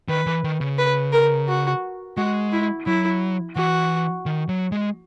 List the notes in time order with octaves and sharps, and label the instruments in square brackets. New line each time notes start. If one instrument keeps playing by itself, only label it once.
[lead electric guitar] D#3 [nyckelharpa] B4
[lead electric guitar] E3
D#3
C#3
[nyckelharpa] B4
A#4
F#4
[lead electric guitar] G#3 [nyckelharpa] F#4
[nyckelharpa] E4
[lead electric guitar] F#3 [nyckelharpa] E4
[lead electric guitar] E3 [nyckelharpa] F#4
[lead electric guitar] D#3
F#3
G#3